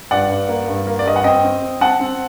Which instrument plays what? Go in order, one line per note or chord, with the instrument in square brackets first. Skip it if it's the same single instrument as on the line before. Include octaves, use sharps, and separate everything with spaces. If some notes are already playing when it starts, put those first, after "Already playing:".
[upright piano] G2 D5 F#5
G2
A#3
G2
A#3
D5
G2 D#5
F#5
C4 D#5 G5
C4
C4
C4 F#5 A5
C4